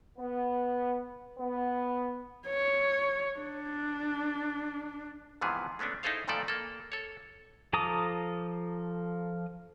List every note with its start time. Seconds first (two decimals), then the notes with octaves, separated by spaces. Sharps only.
0.18 B3
1.39 B3
2.48 C#5
3.39 D4
5.41 G#2 C3 E3 F3 B3 G#4
5.79 G#3 A3 B3 C#4 D4
6.03 D#4 E4 G#4 A4 C5 F5
6.28 G2 A#2 F3 A3 A4 D5
6.48 A#3 A4
6.92 A4 C#5
7.73 F3 A4 A#5 D6 D#6